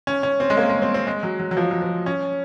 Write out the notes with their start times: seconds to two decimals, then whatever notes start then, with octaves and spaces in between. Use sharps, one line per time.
0.07 C#4
0.23 C#4
0.40 C4
0.50 G#3
0.57 A#3
0.69 G#3
0.82 C4
0.94 C4
1.07 G#3
1.23 F#3
1.39 F#3
1.51 F#3
1.57 F3
1.71 F#3
1.82 F3
2.06 C#4